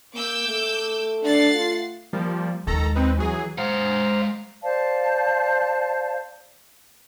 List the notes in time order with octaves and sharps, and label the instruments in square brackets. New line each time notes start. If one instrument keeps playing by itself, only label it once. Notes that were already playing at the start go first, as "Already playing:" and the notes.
[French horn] A#3 [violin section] D6 E6 G6
[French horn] A3
[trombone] D4 [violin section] F#5 A6 C7
[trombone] F4
[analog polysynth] F3 G3 A#3
[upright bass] D#2 G#3 [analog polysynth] D#3 A4 A#5
[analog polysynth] C4 D#4 B4
E3 F#3 G#4
[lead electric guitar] G#3 F#5 [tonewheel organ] C5 F5 A#5
[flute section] C5 D5 F5 A5